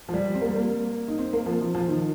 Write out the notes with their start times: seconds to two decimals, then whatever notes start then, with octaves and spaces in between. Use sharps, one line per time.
0.09 F3
0.13 G3
0.34 C4
0.41 A#3
0.49 G3
0.56 A#3
1.08 D#4
1.18 C4
1.33 A#3
1.46 F3
1.61 F3
1.75 F3
1.88 D#3